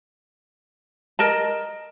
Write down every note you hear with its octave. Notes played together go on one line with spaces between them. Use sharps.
A#4 D#5 A5